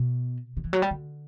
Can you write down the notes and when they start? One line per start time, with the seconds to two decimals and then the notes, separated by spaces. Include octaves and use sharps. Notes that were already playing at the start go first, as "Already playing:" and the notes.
Already playing: B2
0.57 D3
0.65 E3
0.73 F#3
0.82 G3
0.91 D3